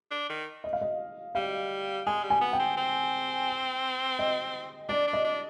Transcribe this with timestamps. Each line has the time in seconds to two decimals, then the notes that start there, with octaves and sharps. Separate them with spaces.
0.11 D4
0.30 D#3
0.64 D#5
0.73 F5
0.81 D#5
1.35 G3 F5
2.07 G#3 G#5
2.23 G3
2.30 G#5
2.41 B3
2.53 G5
2.60 C4
2.77 C4
4.19 D#5
4.89 D4 D5
5.07 D4
5.13 D#5
5.24 D4